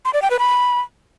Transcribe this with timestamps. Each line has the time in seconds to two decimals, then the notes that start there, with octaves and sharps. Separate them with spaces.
0.05 C6
0.14 D5
0.22 G5
0.31 B4
0.39 B5